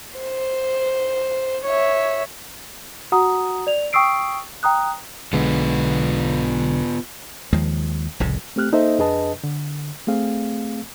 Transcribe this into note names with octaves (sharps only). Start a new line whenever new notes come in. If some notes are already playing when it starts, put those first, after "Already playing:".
C5
C#5 E5
F#4 F#5 A#5 D#6
D5 F7
G5 C#6 D#6 E6 C7 D7
G5 A#5 D#6 F#6
B1 D3 G#3 B3 F4 B4
D#2 D#3 F3 G#3
F1 C2 A2 C#3
A3 C4 G4 F6 F#6
A#3 D#4 A4 C5 D#5 E5
F2 D4 G#4 B4 D#5 A5
D3
A3 C4 G#4 F5